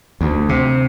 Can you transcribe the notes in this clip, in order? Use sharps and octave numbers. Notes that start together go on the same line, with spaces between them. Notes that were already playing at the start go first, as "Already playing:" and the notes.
D2
C3